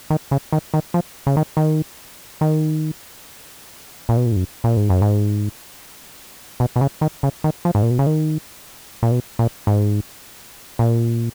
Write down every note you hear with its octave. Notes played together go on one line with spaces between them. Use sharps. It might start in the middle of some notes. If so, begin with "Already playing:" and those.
D#3
C#3
D#3
D#3
F3
C#3
D#3
D#3
D#3
A#2
B2
A#2
G#2
F#2
A#2
G#2
F#2
G#2
B2
B2
C#3
D#3
C#3
D#3
F3
G#2
A#2
B2
C#3
D#3
A#2
B2
A#2
G#2
A#2